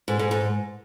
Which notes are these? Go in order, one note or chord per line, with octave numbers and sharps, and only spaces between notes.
G#2
G#2
G#2